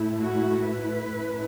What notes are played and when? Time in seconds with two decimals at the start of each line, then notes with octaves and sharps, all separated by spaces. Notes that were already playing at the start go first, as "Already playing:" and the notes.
Already playing: A2 A3 E4
0.21 F#4
0.68 B4
1.15 A2 A3 C#4 E4